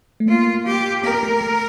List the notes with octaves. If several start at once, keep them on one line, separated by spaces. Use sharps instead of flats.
A3
A#3 F4
G4
A#3 A#4
A3
A3